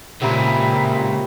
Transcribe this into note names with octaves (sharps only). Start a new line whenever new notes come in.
C#2 A#2 C#3 C4 G4 E5 A#5 B5